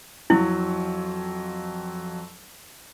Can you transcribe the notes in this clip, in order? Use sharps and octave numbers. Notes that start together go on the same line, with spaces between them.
F2 F#3 E4